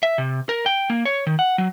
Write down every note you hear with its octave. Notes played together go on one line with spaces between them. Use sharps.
E5
C3
A#4
G5
A#3
C#5
D#3
F#5
F#3